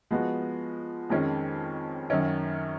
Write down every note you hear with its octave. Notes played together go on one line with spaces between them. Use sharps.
F3 G#3 B3 F#4
F2 D#3 G#3 C#4
F#2 D#3 F#3 C#4